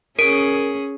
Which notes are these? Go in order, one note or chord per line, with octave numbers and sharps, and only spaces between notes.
C#4 G#4 A#4 D7